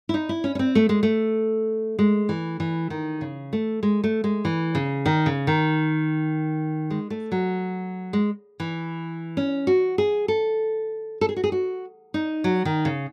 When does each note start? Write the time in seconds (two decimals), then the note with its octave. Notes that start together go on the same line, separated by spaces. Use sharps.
0.09 E4
0.14 D#4
0.29 E4
0.44 C#4
0.55 C#4
0.59 C4
0.75 A3
0.89 G#3
1.03 A3
1.99 G#3
2.29 E3
2.60 E3
2.90 D#3
3.21 C#3
3.53 A3
3.83 G#3
4.04 A3
4.24 G#3
4.45 E3
4.75 C#3
5.06 D#3
5.26 C#3
5.47 D#3
6.90 G#3
7.10 A3
7.32 F#3
8.13 G#3
8.60 E3
9.37 C#4
9.67 F#4
9.98 G#4
10.28 A4
11.21 A4
11.29 G#4
11.36 F#4
11.44 G#4
11.52 F#4
12.14 D#4
12.44 F#3
12.65 D#3
12.85 C#3